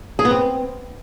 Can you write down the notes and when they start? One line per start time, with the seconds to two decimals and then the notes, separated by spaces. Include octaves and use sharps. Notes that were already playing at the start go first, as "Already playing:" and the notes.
0.19 G#4
0.25 B3
0.31 C4